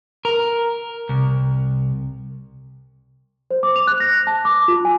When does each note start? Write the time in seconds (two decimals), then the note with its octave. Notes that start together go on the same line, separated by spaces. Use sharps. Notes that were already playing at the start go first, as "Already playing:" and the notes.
0.25 A#4
1.09 C2
3.51 C5
3.63 D6
3.76 F7
3.87 F#6
4.00 A#6
4.27 A5
4.45 D6
4.68 F4
4.85 G#5